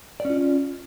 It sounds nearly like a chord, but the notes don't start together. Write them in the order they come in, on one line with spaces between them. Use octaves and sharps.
D5 C#4 F4